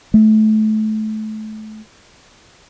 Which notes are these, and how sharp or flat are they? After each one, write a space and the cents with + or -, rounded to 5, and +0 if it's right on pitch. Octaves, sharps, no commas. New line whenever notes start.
A3 -25